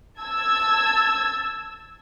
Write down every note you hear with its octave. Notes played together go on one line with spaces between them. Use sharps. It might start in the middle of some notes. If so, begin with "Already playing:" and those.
A5 E6 G#6